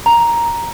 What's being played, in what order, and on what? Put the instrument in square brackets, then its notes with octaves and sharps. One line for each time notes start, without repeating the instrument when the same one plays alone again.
[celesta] A#5